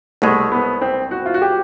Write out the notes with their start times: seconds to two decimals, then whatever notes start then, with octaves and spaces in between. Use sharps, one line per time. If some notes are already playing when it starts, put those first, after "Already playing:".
0.22 C2 B2 G#3 A3
0.52 B3
0.81 C4
1.11 F#4
1.26 F4
1.34 F#4
1.42 G4